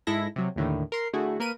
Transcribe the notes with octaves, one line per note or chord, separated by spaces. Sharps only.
G#2 G#3 E4 A4 A#6
C3 F#3
D#2 A2 D3 D#3
A#4 C6
D3 A3 E4 F#4 G#4
A#3 A#4 B4 D#7